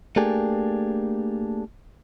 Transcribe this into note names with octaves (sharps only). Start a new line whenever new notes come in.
A3 A#3 D4 G4 G#4